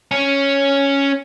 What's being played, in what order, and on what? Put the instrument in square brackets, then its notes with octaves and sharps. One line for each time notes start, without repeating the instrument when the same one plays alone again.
[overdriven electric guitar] C#4